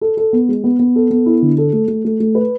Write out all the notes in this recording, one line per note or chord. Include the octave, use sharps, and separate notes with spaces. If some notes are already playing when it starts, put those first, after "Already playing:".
A4
A4
B3
G#3
B3
B3
A4
B3
E4
D3
A4
A3
A3
A3
A3
B4